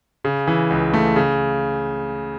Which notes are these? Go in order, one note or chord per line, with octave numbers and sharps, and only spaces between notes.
C#3
E3
C#2
A3
C#3